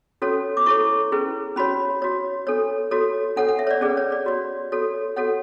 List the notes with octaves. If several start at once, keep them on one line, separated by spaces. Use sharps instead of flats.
C#4 F#4 A4 C#5
D6
E4 A4 C#5 C#6
C#4 E4 G#4 B4
C#4 F#4 C#5 B5
F#4 C#5
D4 A4 C#5
F#4 A4 C#5
D4 A4 C#5 F#5
F#5
E5
C#5
D5
C#4 G#4 B4 D5
C#5
D5
F#4 C#5
F#4 A4 C#5
F#4 A4 C#5 F#5